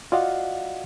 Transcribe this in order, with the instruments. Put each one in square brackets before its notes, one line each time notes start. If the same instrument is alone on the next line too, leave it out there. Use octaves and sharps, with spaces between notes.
[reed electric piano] F4 F#4 D5 D#5 F5 F#5